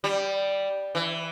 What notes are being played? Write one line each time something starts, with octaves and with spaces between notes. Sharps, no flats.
G3
E3